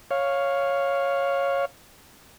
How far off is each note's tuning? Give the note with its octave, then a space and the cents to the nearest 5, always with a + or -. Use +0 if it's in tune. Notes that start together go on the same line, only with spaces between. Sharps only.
C#5 -5 F5 +0